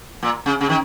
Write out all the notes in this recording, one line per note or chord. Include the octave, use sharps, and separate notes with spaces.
A#2
C#3
C#3
D#3